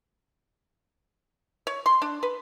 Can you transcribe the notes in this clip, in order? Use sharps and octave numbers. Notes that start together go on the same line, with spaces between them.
C#5
C6
D4
B4